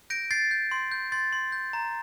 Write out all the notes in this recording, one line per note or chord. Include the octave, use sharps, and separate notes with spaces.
G6 A#6 D7
G6 A6 C7
G6
C6
G6
C6 A6
C6
G6
A#5